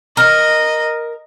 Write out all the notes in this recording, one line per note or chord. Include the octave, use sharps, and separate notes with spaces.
A#4 D#5